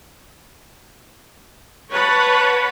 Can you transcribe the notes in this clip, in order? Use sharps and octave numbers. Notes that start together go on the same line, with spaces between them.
B4 C#5 F#5 A5 B5